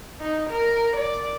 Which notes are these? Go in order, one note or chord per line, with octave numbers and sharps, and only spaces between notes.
D#4
A#4
D5